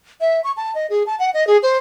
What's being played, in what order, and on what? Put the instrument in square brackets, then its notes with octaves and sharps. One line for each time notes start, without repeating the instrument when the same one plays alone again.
[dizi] E5
C#6
A5
D#5
G#4
A5
F#5
D#5
G#4
C5